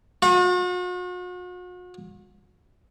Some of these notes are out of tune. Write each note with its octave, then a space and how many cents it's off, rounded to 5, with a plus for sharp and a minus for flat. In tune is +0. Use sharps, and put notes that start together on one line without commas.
F#4 -45